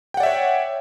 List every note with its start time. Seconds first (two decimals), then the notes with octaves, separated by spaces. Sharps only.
0.14 G5
0.17 F#5
0.20 D5
0.23 E5
0.26 C#5